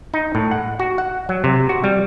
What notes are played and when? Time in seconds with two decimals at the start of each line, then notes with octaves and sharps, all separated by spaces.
0.14 D#4
0.35 A2
0.51 F#5
0.79 F#4
0.98 F#5
1.29 F#3
1.44 C3
1.69 F#4
1.84 G3